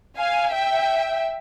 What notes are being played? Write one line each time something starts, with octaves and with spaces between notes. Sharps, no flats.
F5 G#5
E5 G5